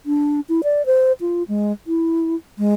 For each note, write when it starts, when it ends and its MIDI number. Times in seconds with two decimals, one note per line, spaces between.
0.06 0.40 62
0.49 0.61 64
0.64 0.85 74
0.86 1.12 72
1.21 1.43 65
1.48 1.72 56
1.87 2.35 64
2.58 2.74 56